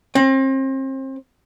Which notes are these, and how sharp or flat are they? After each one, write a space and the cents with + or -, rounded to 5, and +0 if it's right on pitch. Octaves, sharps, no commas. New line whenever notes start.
C4 +35